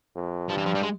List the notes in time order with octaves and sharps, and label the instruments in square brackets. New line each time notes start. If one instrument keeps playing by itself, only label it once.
[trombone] F2
[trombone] G2 [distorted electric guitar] F3
[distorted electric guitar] E3
F3
G3
G#3